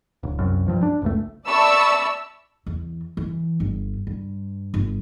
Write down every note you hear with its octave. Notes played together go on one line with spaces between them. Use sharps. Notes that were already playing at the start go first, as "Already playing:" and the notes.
D1
C2 F#2
G2 F3
D4
F#1 C#2 A3
D5 E5 A5 B5 C#6 E6
E2
E3
G1
G2
G1